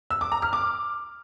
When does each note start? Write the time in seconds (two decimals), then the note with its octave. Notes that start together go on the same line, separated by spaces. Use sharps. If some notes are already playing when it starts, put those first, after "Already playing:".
0.10 E6
0.21 D6
0.32 A#5
0.42 F6
0.53 D6